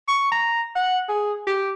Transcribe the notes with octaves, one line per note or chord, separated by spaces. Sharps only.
C#6
A#5
F#5
G#4
G4